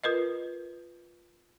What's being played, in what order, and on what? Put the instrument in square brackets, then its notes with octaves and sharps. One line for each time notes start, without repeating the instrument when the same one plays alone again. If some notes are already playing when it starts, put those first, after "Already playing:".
[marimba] F4 A#4 B4 D#5